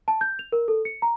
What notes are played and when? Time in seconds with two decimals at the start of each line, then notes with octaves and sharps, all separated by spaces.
0.08 A5
0.21 G6
0.39 F7
0.52 A#4
0.68 A4
0.85 C#7
1.02 A#5